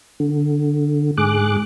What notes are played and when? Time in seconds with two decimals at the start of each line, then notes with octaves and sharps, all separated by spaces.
0.20 D3
1.17 G#2 G#4 D6 F#6